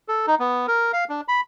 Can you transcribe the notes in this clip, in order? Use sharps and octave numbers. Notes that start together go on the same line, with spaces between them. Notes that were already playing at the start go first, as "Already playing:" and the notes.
A4
D#4
B3
A#4
F5
D4
B5